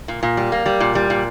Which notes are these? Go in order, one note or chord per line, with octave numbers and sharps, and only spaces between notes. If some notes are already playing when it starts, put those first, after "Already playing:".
A#2
A#2
G3
A#3
G3
A#2
G3
A#2